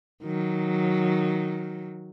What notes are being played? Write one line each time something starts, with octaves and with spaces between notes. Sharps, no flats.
D#3 F#3